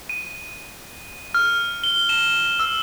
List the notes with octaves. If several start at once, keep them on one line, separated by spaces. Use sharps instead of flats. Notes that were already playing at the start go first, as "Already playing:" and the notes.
D#7
F6
G7
E7
E6